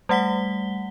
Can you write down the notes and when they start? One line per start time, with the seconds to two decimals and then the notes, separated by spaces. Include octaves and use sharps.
0.09 G3 A3 F#5 B6 G7